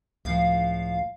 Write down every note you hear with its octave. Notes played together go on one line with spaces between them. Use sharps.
C#2 A2 F3 F5